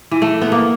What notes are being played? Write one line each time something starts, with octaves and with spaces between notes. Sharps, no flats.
E3
A3
B3
A#3